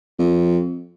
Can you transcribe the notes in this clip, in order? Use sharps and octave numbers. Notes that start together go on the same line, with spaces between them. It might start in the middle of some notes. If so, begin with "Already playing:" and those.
F2